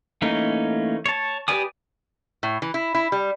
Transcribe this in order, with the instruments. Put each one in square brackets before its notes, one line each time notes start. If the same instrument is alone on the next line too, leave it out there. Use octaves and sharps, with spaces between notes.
[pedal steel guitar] E3 A3 A#3 C#4 D#4
C#5 A5
G4 B4 D5 G#5 D#6
[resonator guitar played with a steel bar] A2
E3
E4
E4
G3